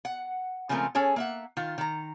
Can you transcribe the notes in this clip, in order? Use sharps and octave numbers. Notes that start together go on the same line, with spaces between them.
F#5
C#3 F3 G#3 A3 C4 A#4
C#4 G#4 A4 C#5
A#3 E5 F#5
D#3 F4
D#3 A#5